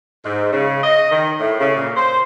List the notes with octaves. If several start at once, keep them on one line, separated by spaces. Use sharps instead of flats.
G#2
C#3
D#5
D#3
A2
C#3
A#2
C5